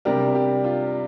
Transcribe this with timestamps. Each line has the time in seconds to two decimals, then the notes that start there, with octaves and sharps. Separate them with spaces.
0.05 C3 G3 D4 G4 A#4
0.35 G4
0.64 F4